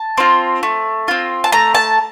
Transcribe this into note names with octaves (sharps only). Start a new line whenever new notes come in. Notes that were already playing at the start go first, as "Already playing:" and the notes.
Already playing: A5
C4 F4
A3
C4 F4
A5
A3 A#5
A5